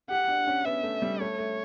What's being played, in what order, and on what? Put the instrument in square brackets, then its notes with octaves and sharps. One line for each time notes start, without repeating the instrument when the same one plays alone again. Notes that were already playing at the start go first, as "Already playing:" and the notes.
[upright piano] G4 [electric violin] F#5
[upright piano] D4
C#4
[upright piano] B3 [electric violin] E5
[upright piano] A3
G3
[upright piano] A3 [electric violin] C#5
[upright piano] A3